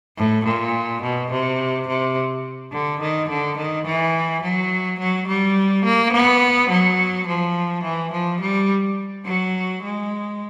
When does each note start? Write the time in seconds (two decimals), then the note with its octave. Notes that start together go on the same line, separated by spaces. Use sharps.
0.17 A2
0.45 A#2
1.02 B2
1.31 C3
1.88 C3
2.73 D3
3.01 D#3
3.29 D3
3.58 D#3
3.86 E3
4.43 F#3
5.00 F#3
5.28 G3
5.85 A#3
6.13 B3
6.70 F#3
7.27 F3
7.84 E3
8.12 F3
8.41 G3
9.25 F#3
9.83 G#3